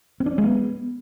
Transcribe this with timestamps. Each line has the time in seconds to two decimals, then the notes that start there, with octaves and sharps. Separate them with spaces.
0.20 C4
0.26 D4
0.32 C#4
0.38 G#3
0.44 B3